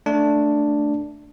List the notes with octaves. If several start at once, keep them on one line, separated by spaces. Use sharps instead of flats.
A3 D4